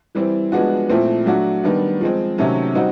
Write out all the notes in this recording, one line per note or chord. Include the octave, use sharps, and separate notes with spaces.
E3 G3 C4 E4
F3 G#3 B3 D4 F#4
A#2 F3 A3 C4 E4
F#3 A3 D4 F#4
D#3 G3 B3 D4
F3 G#3 C4
C3 D#3 F#3 A3 C#4
G3 C4 D#4 F#4